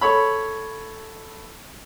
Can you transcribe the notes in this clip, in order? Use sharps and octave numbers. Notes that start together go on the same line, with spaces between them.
A4 C#5 B5